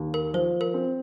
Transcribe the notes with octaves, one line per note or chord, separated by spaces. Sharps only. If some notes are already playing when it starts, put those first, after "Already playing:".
Already playing: D#2
A#4
F3 C5
A#4
C4